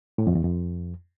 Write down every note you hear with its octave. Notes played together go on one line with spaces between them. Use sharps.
A2
F2
E2
F2